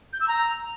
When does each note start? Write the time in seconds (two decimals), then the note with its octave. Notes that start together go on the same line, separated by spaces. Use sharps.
0.13 G6
0.21 E6
0.28 A#5